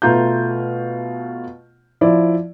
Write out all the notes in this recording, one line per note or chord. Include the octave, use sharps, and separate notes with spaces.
B2 A3 F4 A#5 G6
F3 E4 D5